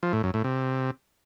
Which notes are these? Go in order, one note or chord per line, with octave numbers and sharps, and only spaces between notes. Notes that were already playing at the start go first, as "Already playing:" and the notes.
F3
A2
F#2
A2
C3